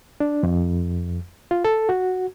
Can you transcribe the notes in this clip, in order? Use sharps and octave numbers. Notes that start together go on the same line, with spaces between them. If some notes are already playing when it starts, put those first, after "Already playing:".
D4
F2
F4
A4
F#4